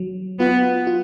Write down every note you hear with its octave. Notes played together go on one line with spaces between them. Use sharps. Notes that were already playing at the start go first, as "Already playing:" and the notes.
Already playing: F#3
B3 F4
F4